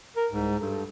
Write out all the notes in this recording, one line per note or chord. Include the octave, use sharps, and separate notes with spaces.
A#4
C2 G#2
G2 A4